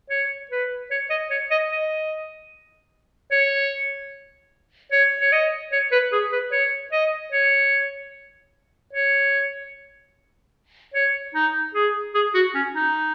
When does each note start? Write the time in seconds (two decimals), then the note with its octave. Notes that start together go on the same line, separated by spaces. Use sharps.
0.10 C#5
0.51 B4
0.91 C#5
1.10 D#5
1.31 C#5
1.51 D#5
1.71 D#5
3.32 C#5
4.92 C#5
5.21 C#5
5.32 D#5
5.72 C#5
5.92 B4
6.13 G#4
6.32 B4
6.52 C#5
6.93 D#5
7.32 C#5
8.93 C#5
10.94 C#5
11.35 D#4
11.75 G#4
12.15 G#4
12.34 F#4
12.55 C#4
12.75 D#4